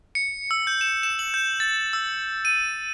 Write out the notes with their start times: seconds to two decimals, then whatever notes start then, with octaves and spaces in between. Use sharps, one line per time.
0.15 C#7
0.51 E6
0.67 G6
0.81 E7
1.03 E7
1.19 F#7
1.34 G6
1.60 A6
1.93 E6
2.45 D#7